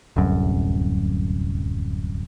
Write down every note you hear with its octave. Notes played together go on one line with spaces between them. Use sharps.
D1 C2 F#2